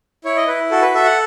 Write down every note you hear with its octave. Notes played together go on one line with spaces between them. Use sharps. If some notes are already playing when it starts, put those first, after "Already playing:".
E4 C#5
D#5
E4 B4
F#4 A4
B4
A4 E5
F#5